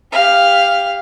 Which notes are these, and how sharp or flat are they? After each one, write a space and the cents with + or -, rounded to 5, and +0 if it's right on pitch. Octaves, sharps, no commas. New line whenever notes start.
G4 +20 F5 +0